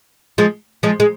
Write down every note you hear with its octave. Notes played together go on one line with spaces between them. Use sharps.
F3 G#3
F3 G#3
G#3